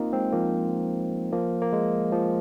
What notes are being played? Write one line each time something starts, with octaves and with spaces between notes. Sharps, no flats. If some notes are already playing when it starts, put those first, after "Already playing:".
Already playing: A#3 C4 D#4 F4
G#3 C4
F3 A#3
F3 A#3
A#3
G#3
F3